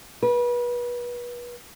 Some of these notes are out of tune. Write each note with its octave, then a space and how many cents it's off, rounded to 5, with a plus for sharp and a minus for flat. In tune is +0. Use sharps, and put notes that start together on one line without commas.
B4 -30